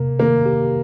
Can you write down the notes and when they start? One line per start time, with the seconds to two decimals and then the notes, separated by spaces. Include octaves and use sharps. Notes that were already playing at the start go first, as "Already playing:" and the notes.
Already playing: C3 A#3
0.19 D#3 A#3
0.46 G4